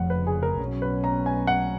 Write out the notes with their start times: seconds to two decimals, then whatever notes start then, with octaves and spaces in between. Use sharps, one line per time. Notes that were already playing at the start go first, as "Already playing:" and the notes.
Already playing: F1 F2 C#3 F3 F#5
0.10 B4
0.27 G#4
0.43 A#4
0.59 B1 B2 F#3 C#4
0.82 B4
1.04 A#5
1.26 G#5
1.47 F#5